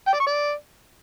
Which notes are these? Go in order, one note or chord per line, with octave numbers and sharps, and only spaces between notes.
G5
D5
C#6
D5